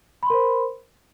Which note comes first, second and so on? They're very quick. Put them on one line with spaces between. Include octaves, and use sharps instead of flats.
B5 C6 A#4 C5